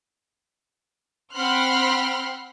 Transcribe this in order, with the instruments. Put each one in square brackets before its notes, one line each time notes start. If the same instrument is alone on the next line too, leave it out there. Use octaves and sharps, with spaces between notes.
[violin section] C4 F#5 B5 C6 F6 F#6